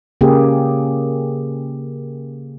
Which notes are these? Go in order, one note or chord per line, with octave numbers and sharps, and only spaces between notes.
C#3 A#3 G4 G#4